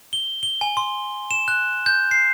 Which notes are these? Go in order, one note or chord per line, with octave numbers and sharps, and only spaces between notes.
G7
G7
G#5
C6
E7
F#6
G6
C7